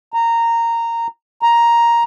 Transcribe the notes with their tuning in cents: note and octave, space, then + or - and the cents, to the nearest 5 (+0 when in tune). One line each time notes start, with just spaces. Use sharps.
A#5 -15
A#5 +5